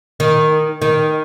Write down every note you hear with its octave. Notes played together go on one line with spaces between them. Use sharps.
D#3
D#3